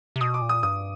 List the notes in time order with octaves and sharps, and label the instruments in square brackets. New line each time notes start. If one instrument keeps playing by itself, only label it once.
[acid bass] C3
[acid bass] B2 [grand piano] D#6
[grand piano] D6
[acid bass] A#2
[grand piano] D#6
[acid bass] G2 [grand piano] D#6